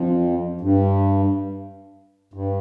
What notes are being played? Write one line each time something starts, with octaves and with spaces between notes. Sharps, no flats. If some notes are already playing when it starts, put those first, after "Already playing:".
Already playing: F2
G2
G2